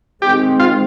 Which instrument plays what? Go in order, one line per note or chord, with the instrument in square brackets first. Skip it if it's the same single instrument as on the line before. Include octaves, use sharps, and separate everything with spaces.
[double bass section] D#3 G#3 C4 [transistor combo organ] G4
[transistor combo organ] F4